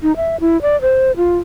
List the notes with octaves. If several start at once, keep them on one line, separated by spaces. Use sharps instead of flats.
D#4
E5
E4
D5
C5
F4